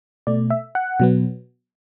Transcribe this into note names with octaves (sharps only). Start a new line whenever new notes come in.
B2 A3 D5
E5
F#5
B2 F#3 B3